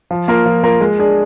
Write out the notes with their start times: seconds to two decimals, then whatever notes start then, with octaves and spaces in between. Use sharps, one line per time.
0.11 F3
0.28 A#3 F4 A#4
0.46 F3
0.64 A#3 F4 A#4
0.81 G#3
0.99 D4 G#4